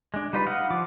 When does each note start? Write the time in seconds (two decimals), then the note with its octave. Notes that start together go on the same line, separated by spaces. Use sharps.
0.14 G#3 D4
0.33 G3 D#4 F4 B4
0.47 D#5 F5 F#5
0.70 F3 F4 D6